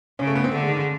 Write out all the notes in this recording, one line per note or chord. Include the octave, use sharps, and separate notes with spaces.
C#3 C#4
A3
B3
C4
D3 A3
G#3
D#3
C#3